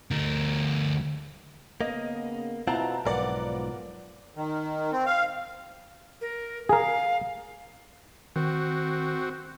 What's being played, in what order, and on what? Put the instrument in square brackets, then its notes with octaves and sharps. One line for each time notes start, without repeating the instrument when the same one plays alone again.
[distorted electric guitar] D2 A#4
[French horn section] C#3 B3 [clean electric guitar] A#3 [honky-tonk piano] D#5
[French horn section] B2 B3 E4 [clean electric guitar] C4 F4 F#5 [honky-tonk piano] A5 A#5
[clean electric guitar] B1 G#2 [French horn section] F3 F4 B4 [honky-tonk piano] A#4 D5 F#5
[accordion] D#3
C4
F5
[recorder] A#4
[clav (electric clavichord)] G#4 A#4 [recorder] F5
[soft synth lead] D#3 [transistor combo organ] C4 F#4